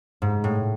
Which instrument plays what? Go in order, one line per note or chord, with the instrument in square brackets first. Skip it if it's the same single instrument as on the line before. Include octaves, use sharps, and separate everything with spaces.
[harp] G#2
A2